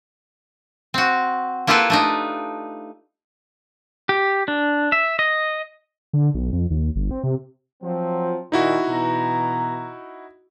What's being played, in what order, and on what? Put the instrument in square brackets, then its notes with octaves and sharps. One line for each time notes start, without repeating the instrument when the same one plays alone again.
[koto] C4 F#4
A#3 E4 F4 G4 A4 B4
A3 D4 D#4
[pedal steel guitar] G4
D4
E5
D#5
[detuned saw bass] D3
B1
F2
D#2
G1
C4
C3
[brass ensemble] F3 F#3 C4
[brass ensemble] A#2 D#3 [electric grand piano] D#4 E4 F#4
[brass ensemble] B2 E3 A#5